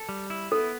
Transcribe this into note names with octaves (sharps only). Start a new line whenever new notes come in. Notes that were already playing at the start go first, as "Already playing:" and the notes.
Already playing: A4
G3
E4
B3 A4